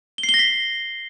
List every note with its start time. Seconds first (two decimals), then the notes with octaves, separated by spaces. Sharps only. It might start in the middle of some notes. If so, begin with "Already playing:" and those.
0.18 G7
0.23 C7
0.29 G7
0.34 A#6
0.39 B6